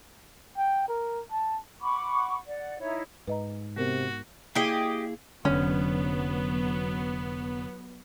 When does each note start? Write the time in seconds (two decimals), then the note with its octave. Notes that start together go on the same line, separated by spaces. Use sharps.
0.58 G5
0.89 A#4
1.31 A5
1.81 F#5 B5 C#6 D6
2.47 D5 F#5
2.79 D#4 E4 C#5
3.28 G#2 B4 D#5 A#5
3.77 C3 B3 F#4 A#4
4.55 A#3 E4 G4 G#4 D#5
5.45 F1 D3 F#3 B3 C#4